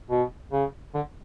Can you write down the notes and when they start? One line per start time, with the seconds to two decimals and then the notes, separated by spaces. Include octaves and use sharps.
0.10 B2
0.52 C#3
0.94 D3